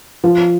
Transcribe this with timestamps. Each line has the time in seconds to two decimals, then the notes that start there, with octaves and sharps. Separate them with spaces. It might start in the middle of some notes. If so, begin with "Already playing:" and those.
0.24 F3